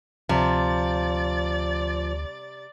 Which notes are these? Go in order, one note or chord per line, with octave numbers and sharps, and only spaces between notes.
D2 C3 F3 D5 A6